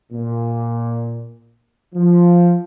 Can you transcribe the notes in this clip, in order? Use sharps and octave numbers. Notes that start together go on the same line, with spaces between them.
A#2
F3